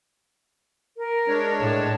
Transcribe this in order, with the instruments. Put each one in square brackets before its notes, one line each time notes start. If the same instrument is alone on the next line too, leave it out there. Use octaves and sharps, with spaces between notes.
[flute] A#4
[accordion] G#3 D4 C#5
[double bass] A2 [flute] A5